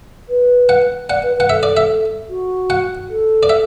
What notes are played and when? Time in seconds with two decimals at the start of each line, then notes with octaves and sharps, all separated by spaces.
0.29 B4
0.69 F#5
1.09 D5 F#5
1.23 B4
1.37 B4 F#5
1.49 A4 E5
1.63 D5
1.77 E5
2.30 F#4
2.70 F#5
3.10 A4
3.43 D5
3.49 E5